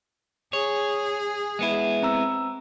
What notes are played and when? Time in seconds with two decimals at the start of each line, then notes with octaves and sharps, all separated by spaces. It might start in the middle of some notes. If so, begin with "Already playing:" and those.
0.53 G#4 C#5
1.59 G#3 B3 E4
2.03 C4 A#5 E6